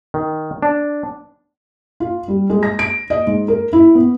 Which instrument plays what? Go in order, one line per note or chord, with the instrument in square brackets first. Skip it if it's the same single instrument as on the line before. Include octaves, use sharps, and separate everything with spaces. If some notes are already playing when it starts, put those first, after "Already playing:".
[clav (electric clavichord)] D#3
D4
[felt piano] F4
G3
G#3
A#6
D7
D#5
G#2
A#4
E4
B3